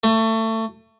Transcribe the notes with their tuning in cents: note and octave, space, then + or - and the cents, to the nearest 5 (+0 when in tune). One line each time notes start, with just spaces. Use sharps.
A3 +25